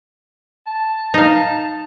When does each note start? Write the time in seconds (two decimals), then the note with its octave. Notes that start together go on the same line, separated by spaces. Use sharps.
0.67 A5
1.14 D#4 F5